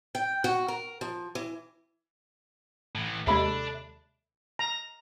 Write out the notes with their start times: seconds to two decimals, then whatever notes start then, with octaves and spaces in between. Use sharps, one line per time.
0.15 G5
0.44 F#4
0.68 A#4
1.01 F3
1.35 E3
2.95 A2 E3
3.27 D#2 C3 G#3 D4 A4 E5 B5
4.59 A#5